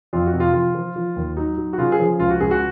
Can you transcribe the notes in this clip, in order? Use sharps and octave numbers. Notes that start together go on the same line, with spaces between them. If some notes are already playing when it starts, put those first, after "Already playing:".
F2 F4
F#4
C3
F4
F3 F4
F3
F3
D#2
F#3 D#4
F#3
F#4
C#3 F4
G#4
F3
C#2 F4
F#4
C#2 G#4
F#4